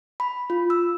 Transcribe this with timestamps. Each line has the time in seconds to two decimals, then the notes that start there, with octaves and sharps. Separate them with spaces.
0.20 B5
0.50 F4
0.70 E6